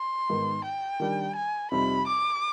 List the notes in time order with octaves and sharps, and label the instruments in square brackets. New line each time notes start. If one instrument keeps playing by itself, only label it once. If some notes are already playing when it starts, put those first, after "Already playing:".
Already playing: [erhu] C6
[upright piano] G#2 D#3 B3 D#4
[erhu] G5
[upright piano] D#3 G3 D4
[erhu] G#5
[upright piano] F2 C3 G3 C4 D#4 [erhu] B5
[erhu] D6